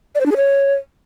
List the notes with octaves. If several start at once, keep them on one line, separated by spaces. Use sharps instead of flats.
D5
C5
D4
G#4
C#5